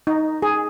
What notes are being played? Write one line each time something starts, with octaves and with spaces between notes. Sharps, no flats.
D#4
G#4